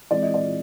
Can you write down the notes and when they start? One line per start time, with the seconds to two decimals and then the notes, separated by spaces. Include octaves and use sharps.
0.11 E3 G#3 C4 D5
0.22 D#5
0.34 D5